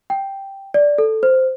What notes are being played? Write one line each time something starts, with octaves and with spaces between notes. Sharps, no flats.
G5
D5
A4
C5